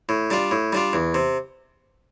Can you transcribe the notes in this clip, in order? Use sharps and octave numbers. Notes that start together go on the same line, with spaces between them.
A2
G3 D4 F4
A2
G3 D4 F4
E2
C3